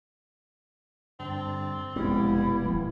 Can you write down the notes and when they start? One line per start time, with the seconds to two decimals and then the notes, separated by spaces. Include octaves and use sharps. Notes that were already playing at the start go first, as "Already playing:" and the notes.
1.20 G2 D3 C4 A5
1.96 F1 B2 G3 G#3 B3 C4 E4
2.65 D#1 F3 A3